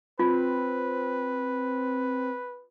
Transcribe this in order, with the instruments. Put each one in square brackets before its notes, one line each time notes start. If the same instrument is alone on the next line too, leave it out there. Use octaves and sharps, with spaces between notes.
[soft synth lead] C4 [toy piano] F4 [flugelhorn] B4